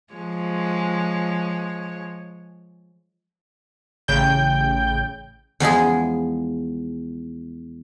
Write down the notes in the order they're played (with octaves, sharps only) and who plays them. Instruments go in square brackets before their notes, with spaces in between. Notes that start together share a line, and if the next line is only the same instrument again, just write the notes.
[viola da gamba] F3 G#3 C#5
[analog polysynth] A1 C#3 G5 G6
[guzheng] E2 F3 G#3 G#4